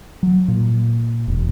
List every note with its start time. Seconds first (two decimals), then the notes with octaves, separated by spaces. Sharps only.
0.23 F#3
0.48 A#2
1.28 E1